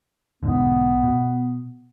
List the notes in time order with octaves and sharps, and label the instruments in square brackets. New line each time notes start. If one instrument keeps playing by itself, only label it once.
[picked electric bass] B1 G#2 D3 [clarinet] B3
[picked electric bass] B2